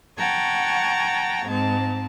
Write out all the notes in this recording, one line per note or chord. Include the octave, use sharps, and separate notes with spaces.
F#5 G5 A5 A#5 C#6 G#6
G#2 G#3 C4 A5